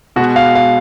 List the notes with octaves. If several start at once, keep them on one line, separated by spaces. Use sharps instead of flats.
B2 G#3 F#4
F5
F5